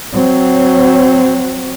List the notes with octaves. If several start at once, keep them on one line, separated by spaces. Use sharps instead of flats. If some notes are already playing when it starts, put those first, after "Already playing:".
F#3 C4